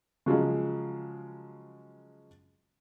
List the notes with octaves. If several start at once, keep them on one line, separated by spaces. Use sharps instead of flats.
C#3 F3 F#3 G#3